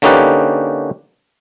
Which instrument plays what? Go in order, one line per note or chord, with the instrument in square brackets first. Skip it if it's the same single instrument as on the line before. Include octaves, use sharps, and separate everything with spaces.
[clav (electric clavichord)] D3 A#3 C#4 D#4 G4 B4